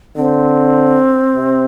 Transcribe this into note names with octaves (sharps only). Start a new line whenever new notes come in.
D3 C4
C3